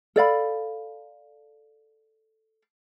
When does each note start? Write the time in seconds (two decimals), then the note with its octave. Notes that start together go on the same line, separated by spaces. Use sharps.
0.16 A4 D5 F5 B5